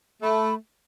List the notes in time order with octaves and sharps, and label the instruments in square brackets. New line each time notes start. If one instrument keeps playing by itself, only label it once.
[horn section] A3 [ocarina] B5